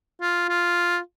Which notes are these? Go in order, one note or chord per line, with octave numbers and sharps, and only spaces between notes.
F4
F4